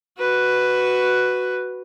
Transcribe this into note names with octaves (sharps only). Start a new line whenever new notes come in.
F#4 B4